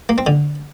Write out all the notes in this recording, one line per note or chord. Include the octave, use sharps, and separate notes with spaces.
A#3
C4
D3